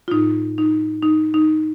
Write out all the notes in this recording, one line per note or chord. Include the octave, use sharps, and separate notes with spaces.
F4
A2 D#4
D#4
D#4
D#4